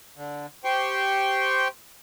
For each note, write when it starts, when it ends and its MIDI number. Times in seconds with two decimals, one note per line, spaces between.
0.16 0.46 50
0.65 1.68 67
0.65 1.68 72
0.65 1.68 79
0.65 1.68 84
0.65 1.68 85